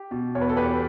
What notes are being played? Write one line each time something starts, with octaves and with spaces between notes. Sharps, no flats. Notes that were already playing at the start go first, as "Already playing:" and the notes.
Already playing: G4
B2
E2 C#5
B4
A4
E2 G4 B4